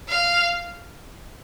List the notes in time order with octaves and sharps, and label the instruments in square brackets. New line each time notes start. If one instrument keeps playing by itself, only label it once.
[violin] F5